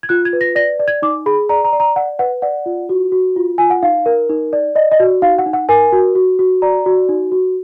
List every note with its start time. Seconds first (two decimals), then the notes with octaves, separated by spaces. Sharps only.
0.03 G#6
0.09 F4 F#6
0.25 G#6
0.33 B4
0.41 A#6
0.56 D5 A#6
0.80 D5
0.88 G#6
1.02 D#4 D6
1.26 G#4 B5
1.49 D5 A#5
1.65 A#5
1.73 D5
1.80 A#5
1.96 D5 F#5
2.19 B4 F#5
2.42 D5 F#5
2.66 F4
2.89 F#4
3.12 F#4
3.36 F4
3.58 F4 G#5
3.70 F#5
3.82 D#4 F5
4.06 A#4
4.29 D#4
4.53 D5
4.75 D5 D#5
4.92 D#5
5.00 F#4
5.22 D#4 F5
5.38 F#5
5.46 D#4
5.53 F#5
5.69 A#4 G#5
5.92 F#4
6.15 F#4
6.39 F#4
6.62 D5 A#5
6.86 F#4
7.09 D#4
7.31 F#4